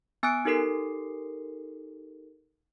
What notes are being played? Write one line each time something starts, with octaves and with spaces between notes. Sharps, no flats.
B3 G#5 D#6 F#6 D7
D#4 G4 A4 A#4 C7